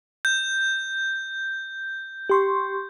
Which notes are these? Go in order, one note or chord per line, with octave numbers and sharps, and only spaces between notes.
G6
G4 C6 C#6